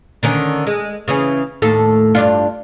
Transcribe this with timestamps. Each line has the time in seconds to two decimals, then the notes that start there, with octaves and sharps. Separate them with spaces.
0.23 D3 D#3 C#4
0.67 G#3
1.08 C#3 E3 C#4
1.62 D#2 A2 A4
2.15 G2 D4 F4